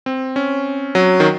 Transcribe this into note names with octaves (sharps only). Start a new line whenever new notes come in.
C4
C#4
F#3
D#3